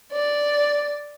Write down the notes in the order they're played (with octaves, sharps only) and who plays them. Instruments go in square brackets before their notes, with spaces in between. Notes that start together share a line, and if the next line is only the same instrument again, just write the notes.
[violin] D5